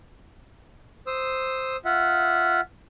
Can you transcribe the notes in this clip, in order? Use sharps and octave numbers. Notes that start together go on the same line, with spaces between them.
C5 D#6 E6
F4 E5 F#5